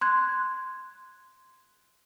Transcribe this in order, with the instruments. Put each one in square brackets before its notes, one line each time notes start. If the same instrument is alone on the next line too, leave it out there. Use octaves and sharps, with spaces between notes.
[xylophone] C6 F#6 G#6